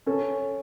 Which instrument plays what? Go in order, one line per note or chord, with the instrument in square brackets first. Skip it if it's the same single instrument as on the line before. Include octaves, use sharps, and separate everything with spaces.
[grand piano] C#4 A4